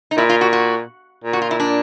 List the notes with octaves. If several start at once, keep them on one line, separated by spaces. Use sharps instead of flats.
D#4
A#2 E4
F4
F#4
F#4
A#2
F#4
F4
E4
D4